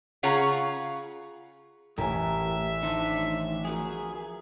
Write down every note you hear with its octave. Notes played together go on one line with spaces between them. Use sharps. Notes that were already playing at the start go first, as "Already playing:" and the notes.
C#3 F4 G#4 C#5 F#5 A#5
A1 A2 G4 A#4 E5 G#5
D#3 E3 D4 D#4 C5
F3 F#4 G#4 A#4